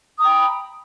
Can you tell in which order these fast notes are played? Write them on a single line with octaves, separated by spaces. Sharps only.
D#6 A#5 G5 B5